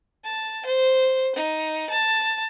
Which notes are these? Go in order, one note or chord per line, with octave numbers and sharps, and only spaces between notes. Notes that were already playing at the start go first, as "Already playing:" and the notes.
A5
C5
D#4
A5